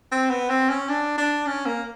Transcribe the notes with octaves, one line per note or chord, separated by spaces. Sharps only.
C4
B3
C4
C#4
D4
D4
C#4
A#3